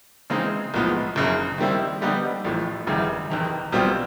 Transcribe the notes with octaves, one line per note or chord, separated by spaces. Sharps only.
C#3 E3 G#3 C4 D#4
B1 A2 F3 G#3 B3
F#1 F#2 C#3
D#3 G3 C4 E4
D3 G3 B3 D#4 G4
A1 A2 F3
G#1 F#2 C#3 E3 G3
F#1 E2 C3 D#3
B1 B2 G3 C4 F4